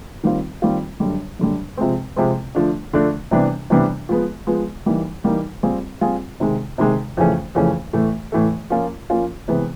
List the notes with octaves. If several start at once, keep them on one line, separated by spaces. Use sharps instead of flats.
D#3 G3 C4 F4
D#3 G3 C4 F4
F#2 D3 G3
F#2 D3 G3
C3 F3 G#3 C4
C3 F3 G#3 C4
D3 F3 A3 D4
D3 F3 A3 D4
C3 E3 G3 B3 D4
C3 E3 G3 B3 D4
F3 G#3 B3
F3 G#3 B3
E3 G3 A#3 D#4
E3 G3 A#3 D#4
G3 C4 F4 G#4
G3 C4 F4 G#4
C3 D#3 G#3
C3 D#3 G#3
F2 C#3 E3 A3 C#4
F2 C#3 E3 A3 C#4
A2 E3 A3
A2 E3 A3
F3 A#3 C#4 F4
F3 A#3 C#4 F4
C3 E3 G#3 B3